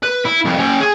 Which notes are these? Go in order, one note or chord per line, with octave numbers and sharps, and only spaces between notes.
B4
E4
C2 F2
C#4 G5
G#4